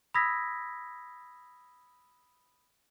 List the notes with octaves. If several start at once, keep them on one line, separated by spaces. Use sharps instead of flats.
B5 D#6 E6 G#6 A#6 B6